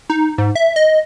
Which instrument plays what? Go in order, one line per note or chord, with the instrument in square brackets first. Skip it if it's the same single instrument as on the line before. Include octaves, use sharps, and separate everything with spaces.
[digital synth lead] D#4
G#2
E5
D#5